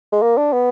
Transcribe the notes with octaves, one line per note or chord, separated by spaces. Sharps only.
G#3
A#3
D4
B3